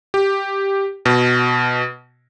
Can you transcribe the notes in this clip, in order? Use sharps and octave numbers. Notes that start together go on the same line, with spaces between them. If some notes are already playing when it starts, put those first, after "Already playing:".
G4
B2